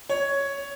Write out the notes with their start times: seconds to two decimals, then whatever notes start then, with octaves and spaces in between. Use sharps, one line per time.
0.09 C#5